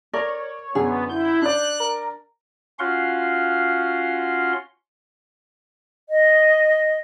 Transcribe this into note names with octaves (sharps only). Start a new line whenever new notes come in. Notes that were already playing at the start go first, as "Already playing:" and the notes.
A#4 C#5 D5
F#2 D3 B3 G#4
E4 G6
D4 D5 F#6
A#4
C#4 F4 F#4 F5 F#5 C6
D#5